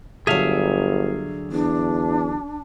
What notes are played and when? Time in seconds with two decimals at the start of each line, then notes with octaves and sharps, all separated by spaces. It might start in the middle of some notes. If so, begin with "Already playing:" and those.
0.27 G1 D3 F#3 G#4 E5 F5
1.52 E2 D4